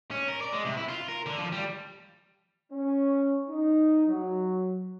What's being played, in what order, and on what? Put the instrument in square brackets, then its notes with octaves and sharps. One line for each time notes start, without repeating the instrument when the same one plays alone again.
[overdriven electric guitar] C#4
A#4
D5
G#3
C3
E4
F4
A#4
D3
F3
G3
[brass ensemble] C#4
D#4
F#3